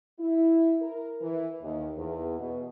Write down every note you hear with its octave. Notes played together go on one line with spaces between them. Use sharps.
E4
A#4
E3
D#2
E2
B2